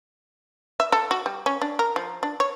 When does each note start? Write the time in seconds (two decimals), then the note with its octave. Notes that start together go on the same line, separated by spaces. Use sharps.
0.80 E5
0.92 A4
1.11 F#4
1.26 G3
1.46 C#4
1.62 D4
1.79 A#4
1.96 F3
2.23 D4
2.40 C#5